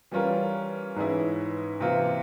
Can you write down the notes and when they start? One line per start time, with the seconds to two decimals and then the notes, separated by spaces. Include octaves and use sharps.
0.11 E3 G3 C#4 F4 A#4
0.96 G#2 E3 G#3 C#4 E4
1.81 C3 E3 A#3 F4